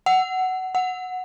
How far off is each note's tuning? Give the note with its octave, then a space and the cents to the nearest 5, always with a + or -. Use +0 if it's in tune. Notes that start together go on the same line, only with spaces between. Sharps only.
F#5 +15
F#5 -5